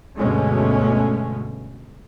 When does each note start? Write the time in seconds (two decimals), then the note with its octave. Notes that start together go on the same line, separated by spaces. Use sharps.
0.16 D2 G2 B2 G#3 A3 C#4